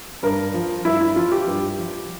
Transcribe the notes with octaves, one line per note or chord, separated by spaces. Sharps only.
G2 A#4
F3
G2 E4
E4
F3 F4
G4
G2
F3